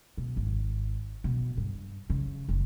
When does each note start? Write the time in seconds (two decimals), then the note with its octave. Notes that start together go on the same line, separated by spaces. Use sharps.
0.18 B2
0.36 G#1
1.24 B2
1.57 G2
2.10 C#3
2.49 F1